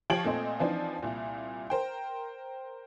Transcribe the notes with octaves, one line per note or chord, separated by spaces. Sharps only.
F3 G4 C#5 G#6 D7 F#7
A#2 A3 C4 D#5
E3 F3 C4 D4 D#4
C2 A#2
A#4 C5 G5